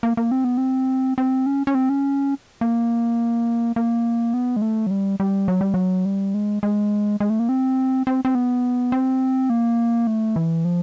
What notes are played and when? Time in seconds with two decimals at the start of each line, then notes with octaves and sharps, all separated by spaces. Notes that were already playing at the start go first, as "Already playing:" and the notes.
0.03 A#3
0.17 A#3
0.31 C4
0.44 B3
0.58 C4
1.18 C4
1.46 C#4
1.67 C#4
1.75 C4
1.89 C#4
2.61 A#3
3.76 A#3
4.34 B3
4.56 G#3
4.62 A3
4.87 F#3
4.91 G3
5.20 G3
5.48 F#3
5.61 G3
5.74 F#3
6.05 G3
6.34 G#3
6.63 G#3
7.20 G#3
7.30 A3
7.40 A#3
7.49 C4
8.07 C4
8.25 C4
8.35 B3
8.92 C4
9.50 A#3
10.07 A3
10.36 E3
10.65 F3